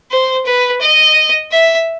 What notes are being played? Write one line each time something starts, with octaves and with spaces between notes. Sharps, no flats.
C5
B4
D#5
E5